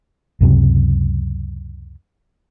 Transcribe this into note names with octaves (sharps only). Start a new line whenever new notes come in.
C#2 F#2 C3 F#3